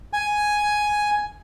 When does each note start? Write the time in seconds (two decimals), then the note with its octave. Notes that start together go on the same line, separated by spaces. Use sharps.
0.13 G#5